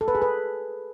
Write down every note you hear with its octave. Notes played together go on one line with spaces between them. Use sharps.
A4
B4
G#4
B4